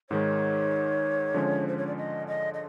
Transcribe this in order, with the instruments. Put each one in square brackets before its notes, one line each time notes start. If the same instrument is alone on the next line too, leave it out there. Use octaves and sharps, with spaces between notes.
[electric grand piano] G#2 D#3 G#3 [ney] C#5
[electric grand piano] D3 F3 G#3 C#4
[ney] C5
C#5
D5
D#5
D#5
D#5